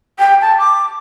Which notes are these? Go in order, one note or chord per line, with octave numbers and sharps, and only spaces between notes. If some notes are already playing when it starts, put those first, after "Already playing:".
G5
A5
D6